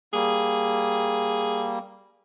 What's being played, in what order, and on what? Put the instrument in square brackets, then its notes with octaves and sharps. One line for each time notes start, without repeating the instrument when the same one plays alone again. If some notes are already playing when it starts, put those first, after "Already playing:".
[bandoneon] G3 A#3 [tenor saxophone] G#4